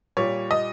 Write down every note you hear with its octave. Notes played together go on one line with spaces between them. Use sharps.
A#2 G3 C#5
D#5